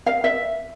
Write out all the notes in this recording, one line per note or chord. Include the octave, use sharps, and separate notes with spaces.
F5
E5